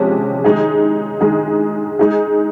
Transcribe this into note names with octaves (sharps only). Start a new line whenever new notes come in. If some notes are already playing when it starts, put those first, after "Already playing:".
Already playing: C3 F3 G#3 C#4 G4
D#3 G#3 D#4 G#4
D#3 G#3 D#4 G#4
G#3 D#4 G#4